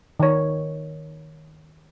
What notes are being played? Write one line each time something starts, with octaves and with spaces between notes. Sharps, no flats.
D#3 C#5